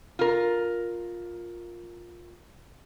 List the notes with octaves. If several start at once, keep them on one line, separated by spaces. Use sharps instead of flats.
F4 A#4